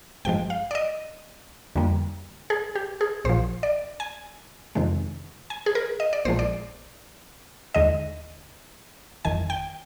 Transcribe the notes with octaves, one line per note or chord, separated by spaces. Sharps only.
G#1 G2 F3 G#3 G5
F5
D5
D#5
F2 D3 G3 A#3
G#4
G4
G#4
A#1 A#2 F3 C5
D5
G#5
F2 C3 D#3 G#3
G#5
G#4
A#4
D#5
D5
A#1 A#2 F3 G#3 C5
D5
D#2 D3 G#3 D#5
G1 F2 D#3 G#5
G5